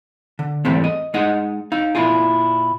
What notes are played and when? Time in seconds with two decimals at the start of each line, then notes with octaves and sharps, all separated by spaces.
0.39 D3
0.65 E2 G#2 G3 A3 C4
0.84 D#5
1.14 G#3 D#4 D#5 F#5
1.72 D#4 F5
1.95 A#2 E4 F4 G#4